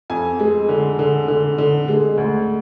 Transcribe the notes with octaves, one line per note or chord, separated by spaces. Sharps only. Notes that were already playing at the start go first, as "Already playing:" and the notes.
F2 G#5
G#3
D3
D3
D3
D3
G#3
D2